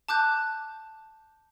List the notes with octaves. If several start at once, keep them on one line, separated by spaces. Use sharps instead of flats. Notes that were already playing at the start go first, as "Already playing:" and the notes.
A5 D6 F#6 G6